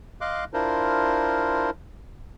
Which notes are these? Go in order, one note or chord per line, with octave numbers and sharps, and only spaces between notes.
D#5 F5 C6 D6 F#6
D4 E4 F4 A#4 C5